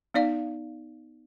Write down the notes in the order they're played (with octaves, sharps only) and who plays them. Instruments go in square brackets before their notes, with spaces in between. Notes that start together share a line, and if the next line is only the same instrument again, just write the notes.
[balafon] B3 D#4 D5 F5